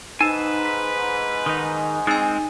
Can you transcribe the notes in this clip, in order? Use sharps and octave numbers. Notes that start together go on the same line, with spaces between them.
G#2 D#4 B4 G#5 A5
B6
D#3 D#4
G#3 C4 D#4 G#5